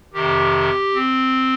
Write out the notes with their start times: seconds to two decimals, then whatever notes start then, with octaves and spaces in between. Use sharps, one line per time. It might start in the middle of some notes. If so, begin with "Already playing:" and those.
0.13 F2 C3 D#3 G4
0.94 C4